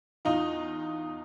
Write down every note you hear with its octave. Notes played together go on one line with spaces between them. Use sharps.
E2 D#4 F4